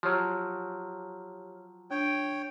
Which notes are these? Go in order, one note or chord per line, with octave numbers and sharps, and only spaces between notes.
F3 F#3 G4 C#5 F6
D4 C#5 G5 D7